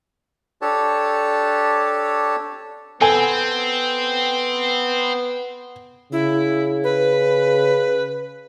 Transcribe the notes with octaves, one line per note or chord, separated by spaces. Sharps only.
D4 G4 A4 C#5 A5
B3 C4 A4 G#5
C#3 E4
B4